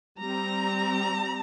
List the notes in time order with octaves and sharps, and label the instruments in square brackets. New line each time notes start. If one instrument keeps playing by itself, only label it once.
[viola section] G3 C4 A#5